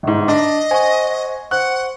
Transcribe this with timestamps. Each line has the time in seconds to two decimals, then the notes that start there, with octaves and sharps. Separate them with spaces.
0.03 G1 G#2
0.28 D4 D#5
0.71 C5 F#5 G#5 C#6
1.51 C5 F#5 C#6 F#6